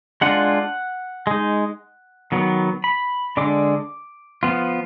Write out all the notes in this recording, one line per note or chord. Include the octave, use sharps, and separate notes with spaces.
G#3 D4 F4 F#5
G#3 D#4
D#3 F#3 B3
B5
D3 G#3 D4 D6
F3 B3 F4